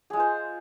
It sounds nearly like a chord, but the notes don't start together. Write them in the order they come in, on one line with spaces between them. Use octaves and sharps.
G#4 G#3 F4 C5